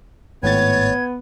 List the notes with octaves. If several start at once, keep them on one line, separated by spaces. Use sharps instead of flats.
G#1 A2 B3 C#5 G#6 A6